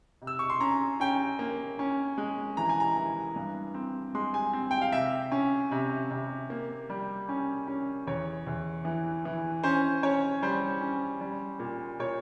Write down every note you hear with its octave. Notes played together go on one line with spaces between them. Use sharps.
C3
E6
C#6
C6
C#4 A#5
C#4 G5
A#3
C#4
G#3
E3 A#5
G#5
A#5
E3
G2
C4
G#3 C6
G#5
C4
G5
F5
C3 E5
C#4
C3
C3
A#3
G3
C#4
C#4
E2 C#5
E2
E3
E3
C#4 C5
C#4 C#5
G3 C5
C#4
G3
A#2
A#2 C#5